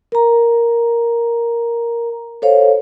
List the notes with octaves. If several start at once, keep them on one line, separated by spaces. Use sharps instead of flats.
A#4 A#5
A4 C5 C#5 F5